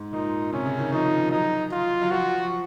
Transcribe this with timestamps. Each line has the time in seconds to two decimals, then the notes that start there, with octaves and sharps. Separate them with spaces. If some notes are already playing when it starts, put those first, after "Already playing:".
Already playing: G#2
0.13 A#2 D#4
0.53 C3 C#4
0.66 C#3
0.79 D#3
0.92 F3 D#4
1.31 F#3 D#4
1.72 F4
2.02 F#3
2.11 F3 F#4